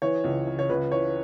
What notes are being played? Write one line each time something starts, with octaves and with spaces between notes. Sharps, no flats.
E3 C#5
C#2
C#3
C#5
C#2 B4
E3 C#5